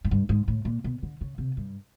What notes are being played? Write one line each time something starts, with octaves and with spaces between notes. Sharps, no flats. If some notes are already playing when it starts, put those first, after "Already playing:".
G#2
G2
G#2
A2
A#2
B2
D3
C#3
C3
G2